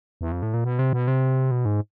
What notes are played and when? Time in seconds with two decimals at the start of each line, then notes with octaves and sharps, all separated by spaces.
0.21 E2
0.32 F2
0.42 A2
0.54 A#2
0.64 B2
0.79 C3
0.93 B2
1.08 C3
1.51 B2
1.65 G#2